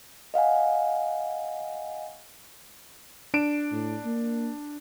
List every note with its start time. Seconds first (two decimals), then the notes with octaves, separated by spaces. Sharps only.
0.34 D#5 F5 F#5 G#5
3.34 D4 D7 E7
3.72 A2
4.04 A#3